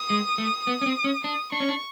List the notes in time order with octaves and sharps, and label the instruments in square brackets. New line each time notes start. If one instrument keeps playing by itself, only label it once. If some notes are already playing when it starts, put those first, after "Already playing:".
Already playing: [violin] D#6
[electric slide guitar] G#3
A3
B3
C#4
C4
C#4
[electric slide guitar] D4 [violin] D#6
[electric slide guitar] D4 [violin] C#6
[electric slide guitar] C#4
D4